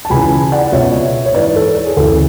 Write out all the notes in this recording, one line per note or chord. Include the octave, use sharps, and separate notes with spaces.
A5
C#2 C#3 E3 G#5 B5
D5 F#5
C#2 B2 C#5 E5
C#5
G#2 E3 B4 D5
A4 C#5
G#4
D2 C#3 E3 A4